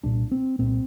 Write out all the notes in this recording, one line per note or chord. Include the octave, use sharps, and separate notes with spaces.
C2 A#2 D4
C4
C2 A#2 C4